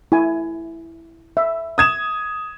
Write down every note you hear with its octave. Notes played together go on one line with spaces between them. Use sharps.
E4 G#5
E5
D#6 G#6 E7